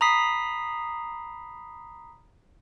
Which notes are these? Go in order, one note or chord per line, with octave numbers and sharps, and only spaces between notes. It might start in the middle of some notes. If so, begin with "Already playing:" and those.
A#5 B5 D#6 B6 C7